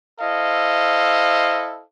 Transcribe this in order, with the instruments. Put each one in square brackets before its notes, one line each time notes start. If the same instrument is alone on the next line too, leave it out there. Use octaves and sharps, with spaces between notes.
[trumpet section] E4 A4 C5 D#5 F5